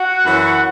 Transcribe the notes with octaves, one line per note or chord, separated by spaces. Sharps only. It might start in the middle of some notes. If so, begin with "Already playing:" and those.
Already playing: F#4 F#5
F#2 E3 C#4